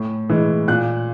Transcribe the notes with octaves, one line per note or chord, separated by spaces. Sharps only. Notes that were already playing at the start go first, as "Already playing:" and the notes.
Already playing: A2
E3 G#3
A#2 F#6